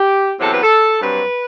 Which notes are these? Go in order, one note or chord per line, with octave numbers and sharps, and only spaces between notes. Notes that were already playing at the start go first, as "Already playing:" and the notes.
Already playing: G4
E2 C3 F#3 C4 A4
B4
A4
G2 F#3 C4 B4